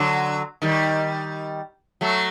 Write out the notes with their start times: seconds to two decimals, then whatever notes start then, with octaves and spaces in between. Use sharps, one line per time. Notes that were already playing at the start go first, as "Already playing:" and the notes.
Already playing: D3 F#3
0.62 D#3 G3
2.01 F#3 A3